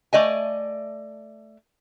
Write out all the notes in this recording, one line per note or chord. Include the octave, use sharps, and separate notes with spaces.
A3 D5 D#5 G#5